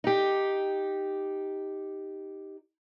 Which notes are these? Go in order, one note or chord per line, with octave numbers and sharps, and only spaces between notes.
D#4 G4